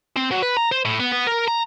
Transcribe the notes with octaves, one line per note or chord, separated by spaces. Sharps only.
C4
F#3
B4
A#5
C5
A2
B3
B3
A#4
A#5